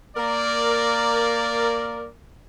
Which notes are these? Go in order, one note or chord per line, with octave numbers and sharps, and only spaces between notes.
A#3 A#4 D5